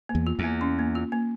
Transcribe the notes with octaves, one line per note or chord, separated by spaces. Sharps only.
A#3
E2
F4
E2
A#3
C#4
A#3
F4
A#3